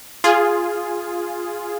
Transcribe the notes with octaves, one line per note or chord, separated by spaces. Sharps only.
F4 G#4